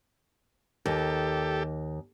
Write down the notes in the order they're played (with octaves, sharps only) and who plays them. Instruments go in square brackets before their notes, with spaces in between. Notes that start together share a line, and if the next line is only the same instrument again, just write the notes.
[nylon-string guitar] D#2 [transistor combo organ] G4 A4